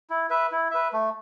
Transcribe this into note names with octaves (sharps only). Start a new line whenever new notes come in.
E4
B4 E5
E4
B4 E5
A3